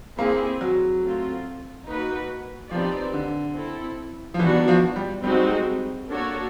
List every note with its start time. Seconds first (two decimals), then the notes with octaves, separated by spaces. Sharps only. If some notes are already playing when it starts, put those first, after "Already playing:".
0.19 A#3 C4 E4 G#4
0.61 F#3
1.03 A3 C4 F4
1.87 A#3 D#4 F#4 B4
2.71 F3 C4 D#4 G4 B4 D5
3.13 D3
3.55 C4 E4 A4
4.34 F3
4.39 D#3 E3 G3 B3 D4 F#4
4.68 F3
4.96 G3
5.23 G3 G#3 C4 D#4 F#4
5.32 F#3
5.39 G3
6.08 A#3 D4 F#4 A4 C#5